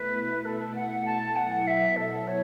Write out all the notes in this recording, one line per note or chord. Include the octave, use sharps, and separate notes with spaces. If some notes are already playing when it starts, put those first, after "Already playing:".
Already playing: B2 A3 E4 B4
A4
F#5
A5
B2 F#3 B3 E4 F#5
E5
A4
C#5